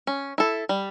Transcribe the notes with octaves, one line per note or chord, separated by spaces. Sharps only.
C#4
E4 A4
G3